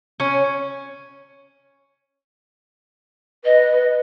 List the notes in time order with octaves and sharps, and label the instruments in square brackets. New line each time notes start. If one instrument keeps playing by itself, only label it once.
[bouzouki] C#4
[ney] B4 [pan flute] D#5